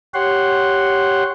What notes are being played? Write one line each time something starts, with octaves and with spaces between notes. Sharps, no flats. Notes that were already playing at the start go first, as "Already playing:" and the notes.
G4 C#5 F#5 C6